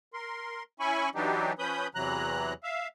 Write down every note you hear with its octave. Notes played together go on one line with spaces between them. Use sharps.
A#4 C6
C#4 E4 G#5 B5 C#6
E3 F#3 D4 D#4 G4
F3 C#4 B4 B5 D#6 G6
E2 C3 E3 F#3 A#5 F#6
E5 F5